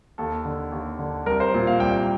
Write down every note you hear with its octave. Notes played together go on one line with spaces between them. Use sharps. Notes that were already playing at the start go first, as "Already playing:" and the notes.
D#2 A4
D3
D#2
D3
C2 A#4
C5
A#2
F5
C2 G5